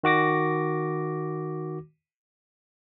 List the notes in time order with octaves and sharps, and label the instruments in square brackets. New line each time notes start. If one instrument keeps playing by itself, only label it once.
[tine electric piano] D#3 F#4 D6 A#6